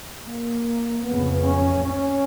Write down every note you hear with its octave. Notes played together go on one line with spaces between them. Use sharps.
A#3
F2 C#3 B3
C#4
C#4